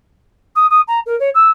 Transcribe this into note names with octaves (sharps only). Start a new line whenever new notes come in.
D#6
D#6
A#5
A#4
C#5
E6